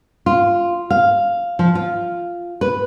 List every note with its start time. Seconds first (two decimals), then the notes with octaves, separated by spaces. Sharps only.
0.26 F4
0.90 F5
1.59 F3
1.75 F4
2.61 B4